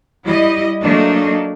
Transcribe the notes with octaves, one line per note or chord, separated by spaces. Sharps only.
G3 E4 D#5
F#3 A3 A#3 D4 D#4